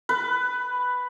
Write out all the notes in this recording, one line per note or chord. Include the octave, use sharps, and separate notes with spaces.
B4